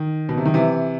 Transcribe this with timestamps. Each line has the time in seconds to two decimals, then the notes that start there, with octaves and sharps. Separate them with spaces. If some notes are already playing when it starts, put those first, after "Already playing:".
Already playing: D#3
0.29 B2
0.37 C3
0.46 D#3
0.54 C3 E3